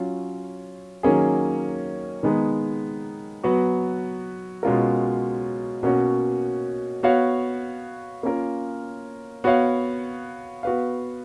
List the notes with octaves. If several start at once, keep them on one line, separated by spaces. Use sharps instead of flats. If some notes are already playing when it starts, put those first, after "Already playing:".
Already playing: F#3 C#4 F4
D#3 F#3 A#3 C#4 G#4
D#3 G#3 B3 D#4 G#4
F#3 B3 F#4 B4
B2 G#3 C#4 F4 A#4
B2 A#3 C#4 F#4 C#5
B3 F#4 C#5 F5
A#3 C#4 F4 A#4
B3 F#4 C#5 F5
B3 F#4 B4 F5